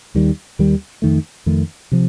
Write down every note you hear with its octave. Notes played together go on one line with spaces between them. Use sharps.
D#2 D#3 G3
D#2 D#3 G3
F2 D#3 A3
F2 D#3 A3
C3 F3